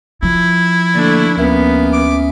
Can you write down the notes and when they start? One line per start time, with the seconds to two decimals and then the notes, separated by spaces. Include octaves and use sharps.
0.23 F3 E4
0.95 D3 A3 A#3 D4 A6
1.37 D2 A#3 B3 C#4 E5
1.93 D6